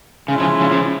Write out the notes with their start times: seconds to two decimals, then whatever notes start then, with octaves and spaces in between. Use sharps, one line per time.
0.28 C#3 G#3 C#4 E4
0.39 C#3 F3
0.60 C#3 F3
0.71 C#3 F3